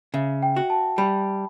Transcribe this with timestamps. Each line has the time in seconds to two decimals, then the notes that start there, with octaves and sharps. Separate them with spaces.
0.14 C#3 E5
0.43 G5
0.56 F#4
0.70 A5
0.98 G3 B5